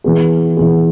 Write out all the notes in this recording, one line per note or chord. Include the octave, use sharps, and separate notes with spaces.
E3 B3 G#4
E3 B3 G#4